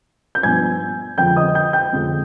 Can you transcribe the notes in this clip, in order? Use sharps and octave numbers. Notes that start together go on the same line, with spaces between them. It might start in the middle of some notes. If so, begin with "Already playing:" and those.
G6
G2 F3 B3 D4 G#5 G#6
F2 D3 F3 G#3 G5 G6
D#5 D#6
G5 G6
G5 G6
F2 D3 F3 G#3